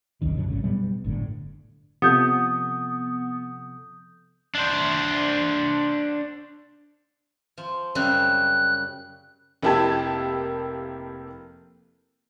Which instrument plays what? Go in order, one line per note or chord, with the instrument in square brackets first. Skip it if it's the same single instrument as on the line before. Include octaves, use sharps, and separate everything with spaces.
[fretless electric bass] F#1 C2 F#2 D#3
F#2 B2 D3 F#3
G#1 G#2 C#3
B2 F#3 G3 B3
G1 A2 D3
[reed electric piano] C3 F3 A4 [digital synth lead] B3 [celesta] D#6 G6
[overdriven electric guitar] D4 C5
[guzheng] F3
[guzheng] F#2 C#3 G3 [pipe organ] F#6
[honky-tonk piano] F1 A#3 E4 G4 A5 G#6